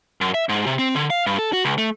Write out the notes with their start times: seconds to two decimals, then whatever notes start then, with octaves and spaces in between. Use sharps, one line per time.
0.21 F#2
0.34 E5
0.49 G#2
0.66 C3
0.79 C4
0.95 D3
1.10 F5
1.26 G2
1.39 A4
1.53 F#4
1.65 C#2
1.78 A3